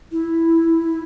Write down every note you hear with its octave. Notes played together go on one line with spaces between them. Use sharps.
E4